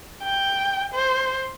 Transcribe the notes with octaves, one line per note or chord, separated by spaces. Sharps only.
G5
C5